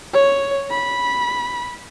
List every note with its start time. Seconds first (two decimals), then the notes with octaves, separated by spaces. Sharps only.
0.13 C#5
0.70 B5